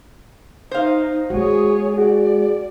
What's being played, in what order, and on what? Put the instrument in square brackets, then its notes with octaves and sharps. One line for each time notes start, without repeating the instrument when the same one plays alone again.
[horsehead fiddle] D#4 [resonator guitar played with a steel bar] C5 F5
[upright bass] G#3 [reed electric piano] F#4 [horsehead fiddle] G#4 C#5
[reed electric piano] F#4 G#4 [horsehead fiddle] D5